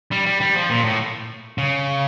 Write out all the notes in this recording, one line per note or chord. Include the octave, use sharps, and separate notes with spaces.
G3
G3
G3
F3
A#2
A2
C#3